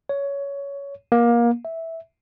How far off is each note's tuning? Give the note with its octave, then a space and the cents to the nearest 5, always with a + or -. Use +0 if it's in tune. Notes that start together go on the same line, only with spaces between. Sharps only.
C#5 +15
A#3 +25
E5 -10